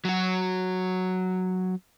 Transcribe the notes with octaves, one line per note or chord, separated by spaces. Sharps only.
F#3 F#4